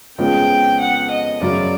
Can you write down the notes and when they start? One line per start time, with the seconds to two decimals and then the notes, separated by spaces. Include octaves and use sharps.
0.18 F2 C#3 F3 G#3 B3 G5
0.80 F#5
1.11 D#5
1.41 F#2 C#3 F#3 D5